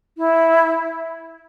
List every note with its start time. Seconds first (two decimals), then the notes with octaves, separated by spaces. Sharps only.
0.17 E4